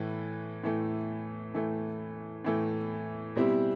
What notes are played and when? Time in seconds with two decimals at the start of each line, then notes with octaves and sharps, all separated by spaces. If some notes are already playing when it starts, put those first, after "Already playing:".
Already playing: A2 E3 A3
0.64 A2 E3 A3
1.54 A2 E3 A3
2.45 A2 E3 A3
3.36 B2 G3 C4 E4 G4